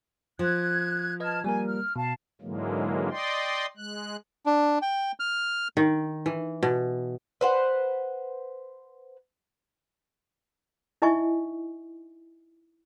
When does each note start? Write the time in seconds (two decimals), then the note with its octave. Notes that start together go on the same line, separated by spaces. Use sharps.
0.39 F3 F#6 G#6
1.20 B4 D#5 A5 F6 G#6
1.44 G3 A#3 A#4 G#5
1.65 F6
1.96 B2 F5 A5
2.41 G#2 D3 E3 F#3 G#3 A#3
3.10 D5 D#5 G5 C6
3.77 G#3 F#6
4.46 D4
4.82 G5
5.20 F6
5.77 D#3
6.26 E3
6.63 B2
7.41 B4 C5 F#5
11.02 D#4 E4 D#5 E5 G#5 C#6